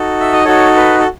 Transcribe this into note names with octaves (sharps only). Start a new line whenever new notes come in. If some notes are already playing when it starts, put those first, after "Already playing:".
Already playing: D#4 F#4 A4
E5
D#5
D#4 F#4 A4 C#5
B4
A4